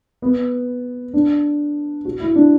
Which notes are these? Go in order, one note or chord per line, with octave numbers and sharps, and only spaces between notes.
B3
D4
F#4
E4
D4